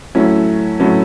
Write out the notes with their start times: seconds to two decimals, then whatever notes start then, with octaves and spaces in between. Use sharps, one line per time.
0.15 A2 F#3 A3 C#4 E4
0.80 A2 F#3 A3 C#4 E4